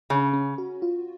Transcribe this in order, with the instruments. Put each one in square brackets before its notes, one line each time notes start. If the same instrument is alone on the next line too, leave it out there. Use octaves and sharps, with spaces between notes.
[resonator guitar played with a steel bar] C#3 [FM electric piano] C#4
[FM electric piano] C#4
F#4
F4